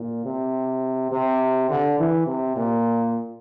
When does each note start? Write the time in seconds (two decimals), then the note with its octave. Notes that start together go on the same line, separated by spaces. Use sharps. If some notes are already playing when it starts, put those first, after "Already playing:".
Already playing: A#2
0.25 C3
1.12 C3
1.70 D3
1.99 E3
2.27 C3
2.56 A#2